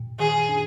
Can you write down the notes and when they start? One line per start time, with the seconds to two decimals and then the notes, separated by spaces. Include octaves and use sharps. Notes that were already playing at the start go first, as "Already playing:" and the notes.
Already playing: A#2
0.20 D#3 G#4
0.49 D4